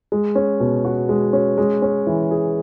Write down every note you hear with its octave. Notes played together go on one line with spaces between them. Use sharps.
G#3
C#4
B2
F#4
G#3
C#4
G#3
C#4
E3
G#4